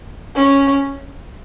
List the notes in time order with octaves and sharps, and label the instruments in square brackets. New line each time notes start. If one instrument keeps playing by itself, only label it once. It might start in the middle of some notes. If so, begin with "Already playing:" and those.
[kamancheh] C#4